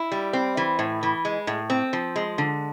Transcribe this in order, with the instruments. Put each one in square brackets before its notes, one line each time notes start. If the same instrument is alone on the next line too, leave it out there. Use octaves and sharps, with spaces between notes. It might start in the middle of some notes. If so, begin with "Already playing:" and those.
Already playing: [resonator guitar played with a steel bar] E4
G3
C4
E3
A2
E3
G#3
A2
C4
F3
G#3
D3